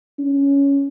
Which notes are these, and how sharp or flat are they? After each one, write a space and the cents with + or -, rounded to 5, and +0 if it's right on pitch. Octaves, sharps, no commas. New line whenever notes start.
C#4 +10